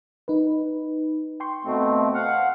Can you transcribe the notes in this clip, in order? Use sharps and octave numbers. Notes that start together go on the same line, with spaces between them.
D#4 B4
G5 C6 C#6
B2 A3 C4
F5 F#5